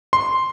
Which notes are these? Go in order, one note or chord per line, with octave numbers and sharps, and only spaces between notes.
C6